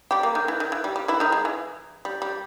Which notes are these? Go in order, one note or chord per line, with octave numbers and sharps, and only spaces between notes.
G3 G4
A#3
D#3
E3
D#3
E3
G3
G3
E3 E4
D#3 D#4
G#3
E3
G3
G3